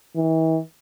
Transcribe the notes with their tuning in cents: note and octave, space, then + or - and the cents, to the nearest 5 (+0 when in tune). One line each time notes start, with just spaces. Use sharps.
E3 -40